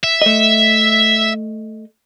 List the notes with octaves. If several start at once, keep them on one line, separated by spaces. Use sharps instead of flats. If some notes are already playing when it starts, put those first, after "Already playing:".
E5
A3 D#5